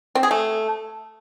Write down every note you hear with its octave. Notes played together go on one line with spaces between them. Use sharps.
C4
G#4
A3